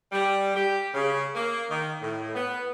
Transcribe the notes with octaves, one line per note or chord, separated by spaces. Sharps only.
G3
G4
C#3
A#3
D#3
A2
B3